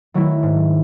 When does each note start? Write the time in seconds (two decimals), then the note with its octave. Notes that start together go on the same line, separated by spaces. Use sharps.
0.14 D#3 F#3 A3 E4
0.43 G#2